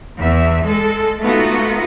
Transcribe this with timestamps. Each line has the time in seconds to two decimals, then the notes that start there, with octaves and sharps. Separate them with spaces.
0.18 E2 E5
0.64 G#3 A4
1.21 A3 B3 D#4 F4 F#4